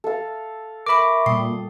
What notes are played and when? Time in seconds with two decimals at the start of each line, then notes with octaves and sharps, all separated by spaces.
0.04 A4 F5
0.87 A#4 E5 B5 C#6 D6
1.26 A#2 G3 G5 D#6